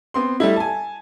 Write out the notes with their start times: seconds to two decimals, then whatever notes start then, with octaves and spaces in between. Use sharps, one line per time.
0.14 B3 C4 C6
0.40 G3 A3 E4
0.56 G#5 A5